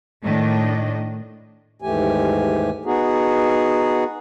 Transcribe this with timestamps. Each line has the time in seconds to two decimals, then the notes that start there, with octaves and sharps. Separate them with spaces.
0.23 A2 D#3 A3 D4 D#5
1.82 D#2 G#2 E3 A3 G4 G#5
2.85 B3 D#4 F#4 G#4